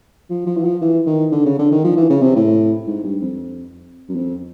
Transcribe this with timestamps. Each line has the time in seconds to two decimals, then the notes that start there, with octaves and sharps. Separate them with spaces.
0.30 F3
0.47 F3
0.57 E3
0.64 F3
0.81 E3
1.06 D#3
1.32 D3
1.46 C#3
1.59 D3
1.71 D#3
1.84 F3
1.97 E3
2.10 C#3
2.22 C3
2.36 A2
2.87 G#2
3.04 G2
3.22 F2
4.09 F#2
4.15 F2